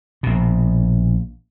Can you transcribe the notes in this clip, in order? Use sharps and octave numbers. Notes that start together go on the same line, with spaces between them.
A#1 B2